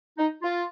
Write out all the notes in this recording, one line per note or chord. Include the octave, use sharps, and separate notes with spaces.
D#4
F4